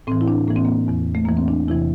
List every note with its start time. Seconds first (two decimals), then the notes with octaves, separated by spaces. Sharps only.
0.07 A2 E3 C4
0.21 E4
0.28 D4
0.48 A2 E3 A#3
0.56 C4
0.65 A#3
0.88 E2 E3
1.15 A3
1.25 E2 E3 A#3
1.37 C4
1.48 D4
1.68 E2 C3 E3 E4